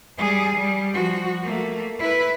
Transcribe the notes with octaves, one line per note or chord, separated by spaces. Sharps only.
G3 G#4
G3
F3 F#4
A3 A#3
E4 B4